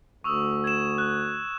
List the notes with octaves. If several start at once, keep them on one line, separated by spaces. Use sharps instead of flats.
D2 C#6 D#6 E6
G#6 E7
F#6